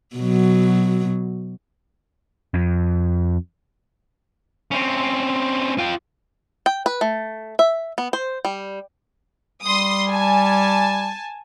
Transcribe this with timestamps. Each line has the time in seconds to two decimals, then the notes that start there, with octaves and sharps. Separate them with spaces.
0.16 B2 F#3
2.54 F2
4.71 C4 C#4
5.78 F4 G5
6.66 G5
6.86 B4
7.01 A3
7.59 E5
7.98 B3
8.13 C5
8.45 G3
9.63 G3 C6 D#6
10.08 G#5 A5